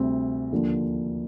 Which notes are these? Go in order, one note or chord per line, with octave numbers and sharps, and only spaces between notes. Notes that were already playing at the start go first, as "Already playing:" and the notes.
Already playing: D2 C3 G3 C4
D#2 D3 F3 A#3